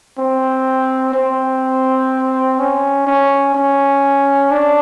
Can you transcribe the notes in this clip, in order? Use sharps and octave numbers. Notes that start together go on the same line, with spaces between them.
C4
C4
C#4
C#4
C#4
D4